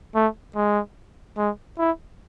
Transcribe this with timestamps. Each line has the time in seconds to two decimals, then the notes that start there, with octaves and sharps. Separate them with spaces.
0.15 A3
0.55 G#3
1.37 G#3
1.79 E4